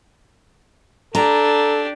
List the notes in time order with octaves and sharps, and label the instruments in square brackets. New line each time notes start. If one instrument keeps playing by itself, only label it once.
[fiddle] D4 G4 [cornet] A4 [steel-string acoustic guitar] A#5